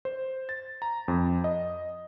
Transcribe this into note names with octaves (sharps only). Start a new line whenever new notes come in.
C5
A6
A#5
F2
D#5